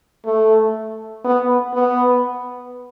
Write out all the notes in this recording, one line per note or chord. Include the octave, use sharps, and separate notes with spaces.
A3
B3
B3